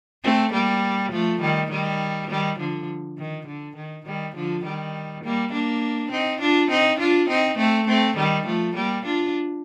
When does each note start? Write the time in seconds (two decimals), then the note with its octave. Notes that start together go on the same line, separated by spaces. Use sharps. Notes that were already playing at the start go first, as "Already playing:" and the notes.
0.23 A3 C4
0.52 G3 A#3
1.12 F3 A3
1.41 D#3 G3
1.70 D#3 G3
2.29 D#3 G3
2.59 D3 F3
3.18 D#3
3.47 D3
3.76 D#3
4.06 D#3 G3
4.35 D3 F3
4.64 D#3 G3
5.24 G3 A#3
5.53 A#3 D4
6.11 C4 D#4
6.41 D4 F4
6.70 C4 D#4
6.99 D4 F4
7.29 C4 D#4
7.58 A3 C4
7.88 A3 C4
8.17 D#3 G3
8.46 F3 A3
8.75 G3 A#3
9.05 D4 F4